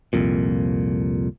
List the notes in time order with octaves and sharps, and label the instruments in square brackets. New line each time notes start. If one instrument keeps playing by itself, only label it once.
[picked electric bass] C2 F2 A#2